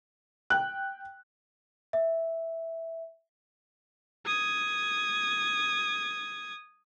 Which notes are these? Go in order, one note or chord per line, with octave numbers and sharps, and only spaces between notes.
G5 F#6
E5
D#6 G#6